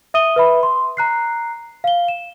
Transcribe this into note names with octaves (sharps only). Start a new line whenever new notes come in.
E5 D#6 D#7 G7
B4 E5 B5
C6
A#5 F#6 C7
F5 G7
E7